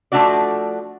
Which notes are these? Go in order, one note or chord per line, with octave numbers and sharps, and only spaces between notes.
F3 G3 A3 D4 F#4 D5